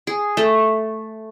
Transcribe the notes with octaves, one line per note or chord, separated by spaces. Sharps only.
G#4
A3